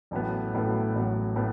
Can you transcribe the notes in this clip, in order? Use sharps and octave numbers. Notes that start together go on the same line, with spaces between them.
A1 A2 F#3 B3
A1 A2 F#3 B3
A1 A2 F#3 B3
A2 F#3 B3